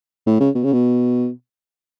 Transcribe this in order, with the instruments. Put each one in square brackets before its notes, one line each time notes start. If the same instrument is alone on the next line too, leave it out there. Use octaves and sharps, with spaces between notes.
[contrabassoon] A2
C#3
B2
C#3
B2